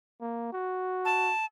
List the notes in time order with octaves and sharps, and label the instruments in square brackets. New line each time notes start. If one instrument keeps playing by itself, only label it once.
[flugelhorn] A#3
F#4
[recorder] A5